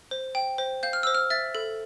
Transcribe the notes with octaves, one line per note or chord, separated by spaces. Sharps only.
C5
G5
C5
F5 G6
F6
C5 E6
F6
E5 A6
A4